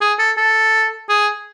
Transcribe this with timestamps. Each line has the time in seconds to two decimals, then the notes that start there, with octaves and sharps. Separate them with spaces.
0.01 G#4
0.19 A4
0.37 A4
1.09 G#4